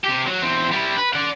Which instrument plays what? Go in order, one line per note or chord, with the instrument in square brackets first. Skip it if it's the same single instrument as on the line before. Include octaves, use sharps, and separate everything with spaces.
[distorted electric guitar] C3 G4
F#3
E2 C4
G3 E4
B4
D5 F#5